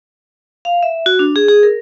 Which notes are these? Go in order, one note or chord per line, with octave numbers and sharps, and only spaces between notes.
F5
E5
F#4
D4
G#4
G#4
A#4